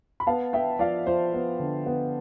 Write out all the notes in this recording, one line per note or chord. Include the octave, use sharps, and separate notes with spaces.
B5
B3 F5 A5
B3 E5 G5
F3 D5 F5
F3 C5
B3
D3
B3